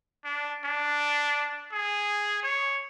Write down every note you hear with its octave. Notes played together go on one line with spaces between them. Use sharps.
D4
D4
G#4
C#5